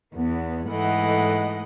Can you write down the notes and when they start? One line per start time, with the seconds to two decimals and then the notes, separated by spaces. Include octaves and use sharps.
0.16 E2 B3
0.70 G#2 E3 A3 D#5 F#5